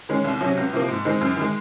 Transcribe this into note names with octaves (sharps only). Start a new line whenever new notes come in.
D#3 G#3 C#4
C2
C3 F#3 C#4
C#2
C3 F3 A#3
G#2
D#3 G#3 C4 D#4
F#2
D#3 G#3